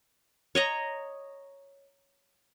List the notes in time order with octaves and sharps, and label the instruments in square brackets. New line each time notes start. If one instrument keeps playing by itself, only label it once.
[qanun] C#5 D#5 A#5